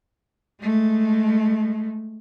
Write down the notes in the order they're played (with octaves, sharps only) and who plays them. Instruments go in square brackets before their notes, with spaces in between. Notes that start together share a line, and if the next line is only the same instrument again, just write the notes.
[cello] G#3 A3